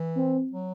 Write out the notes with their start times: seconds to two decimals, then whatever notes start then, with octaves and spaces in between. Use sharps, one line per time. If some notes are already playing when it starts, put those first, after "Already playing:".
Already playing: E3
0.15 C4
0.51 F#3